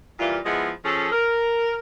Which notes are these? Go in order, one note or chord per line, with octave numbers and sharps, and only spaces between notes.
A#2 E3 G3 F4
F3 G#3 B3 E4 G#4 D#5
F3 C#4 G#4 A4
A#4